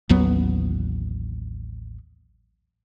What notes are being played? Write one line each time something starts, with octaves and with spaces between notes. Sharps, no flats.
A1 D#2 F#3 B3